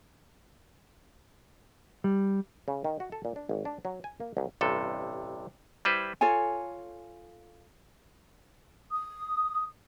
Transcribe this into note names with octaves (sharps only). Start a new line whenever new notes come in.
G3
C#3
D#3
F#4
A4
A#2
D4
G#1
D4
F#3
G#5
A#3
C2
A1 G2 C3 A4
G3 E4 B4 C5
F4 A4 C#5 G#5
D#6